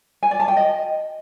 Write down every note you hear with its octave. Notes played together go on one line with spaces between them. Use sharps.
G#5
D5
A5
G5
D#5